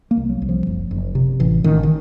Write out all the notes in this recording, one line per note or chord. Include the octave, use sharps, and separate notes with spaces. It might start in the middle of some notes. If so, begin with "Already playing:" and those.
A#3
C2
F#3
C2
F3
F#1
F#1
C3
A1 E3
A1 D#3
D#3